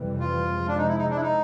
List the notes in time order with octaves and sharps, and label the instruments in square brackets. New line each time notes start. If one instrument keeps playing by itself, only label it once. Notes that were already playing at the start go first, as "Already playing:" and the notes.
Already playing: [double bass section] F2 C3 E3 G3
[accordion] F4
[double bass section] C3 F3 G#3
[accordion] D4
D#4
E4
D#4
D4
E4
D#4